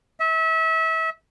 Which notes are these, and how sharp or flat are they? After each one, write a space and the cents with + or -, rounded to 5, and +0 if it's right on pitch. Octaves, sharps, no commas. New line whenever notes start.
E5 -30